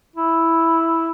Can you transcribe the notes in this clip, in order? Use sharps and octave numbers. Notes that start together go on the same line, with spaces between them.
E4